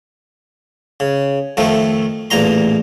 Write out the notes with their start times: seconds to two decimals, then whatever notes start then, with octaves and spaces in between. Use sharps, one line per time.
1.00 C#3
1.57 F2 D#3 F3 A3
2.30 A1 E2 A#2 A#5 C6